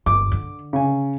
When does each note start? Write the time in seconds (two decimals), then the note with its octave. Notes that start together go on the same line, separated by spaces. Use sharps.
0.06 G1 D6
0.32 D3
0.73 C#3 G#5